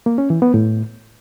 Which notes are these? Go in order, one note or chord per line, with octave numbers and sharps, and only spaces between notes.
A#3
C#4
E3
B3
A2